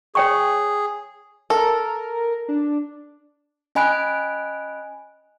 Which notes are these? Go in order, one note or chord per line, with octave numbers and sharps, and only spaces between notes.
G#4 C#5 G5 C#6
A4 A#4
D4
C#4 D#5 G#5 B5 F#6 D7